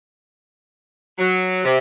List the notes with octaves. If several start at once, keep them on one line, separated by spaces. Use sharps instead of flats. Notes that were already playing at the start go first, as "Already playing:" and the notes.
F#3
C3